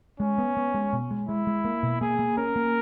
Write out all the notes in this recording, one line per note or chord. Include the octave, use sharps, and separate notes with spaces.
G#3 C#4
B3
B3
G#3
B2
G#3
G#3 E4
G#3
A#3
B2
A#3 G#4
A#3
C#4 A#4
A#3